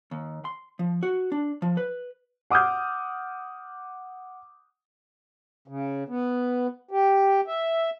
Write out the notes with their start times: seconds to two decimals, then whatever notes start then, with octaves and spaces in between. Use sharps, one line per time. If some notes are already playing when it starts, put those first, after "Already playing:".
0.11 D#2
0.45 C6
0.79 F3
1.03 F#4
1.32 D4
1.62 F3
1.77 B4
2.50 F#5 D6 D#6 F6 G6
5.68 C#3
6.08 B3
6.91 G4
7.47 E5